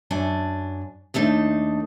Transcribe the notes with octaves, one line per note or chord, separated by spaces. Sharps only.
F#2 D4 G#5
D#2 A3 D4 D#4